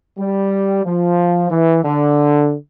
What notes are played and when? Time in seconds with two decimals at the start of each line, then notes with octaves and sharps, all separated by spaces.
0.18 G3
0.85 F3
1.51 E3
1.84 D3